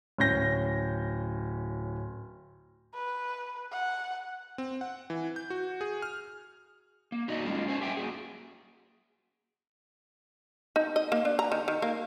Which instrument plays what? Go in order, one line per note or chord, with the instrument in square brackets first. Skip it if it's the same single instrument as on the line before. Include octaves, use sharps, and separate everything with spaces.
[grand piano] D1 C#4 G6 A#6
[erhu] B4
F#5
[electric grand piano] C4
F#5
E3
G6
F#4
G#4
F6
[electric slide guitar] A#3
D#4 F#4 D5 D#5
G3 G#3 C#4 F4 D5
C#4 C5 G#5
G4 E5 G5 G#5
A#3 F#4 G#4
[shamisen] D#4
D#5
A#3
D4
A#5
D#3
D#3
A#3